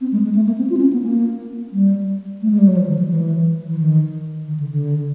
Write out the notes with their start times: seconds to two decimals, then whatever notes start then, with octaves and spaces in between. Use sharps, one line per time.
0.01 C4
0.12 G#3
0.24 G#3
0.35 A3
0.47 A#3
0.58 C4
0.70 F4
0.77 C4
0.81 C#4
0.93 B3
1.04 A#3
1.73 G3
2.42 A3
2.50 G#3
2.59 G3
2.68 F#3
2.77 F3
2.88 D#3
2.99 E3
3.11 E3
3.68 E3
3.79 D#3
4.48 D#3
4.60 D3
4.71 D3